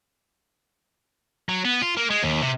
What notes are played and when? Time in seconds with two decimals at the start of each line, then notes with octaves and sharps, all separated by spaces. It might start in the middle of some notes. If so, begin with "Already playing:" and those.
1.49 F#3
1.65 B3
1.82 F4
1.97 A#3
2.10 G#3
2.23 D#2
2.42 C3